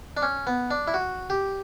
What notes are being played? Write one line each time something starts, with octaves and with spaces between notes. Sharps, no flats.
D4
C#4
B3
D4
E4
F#4
G4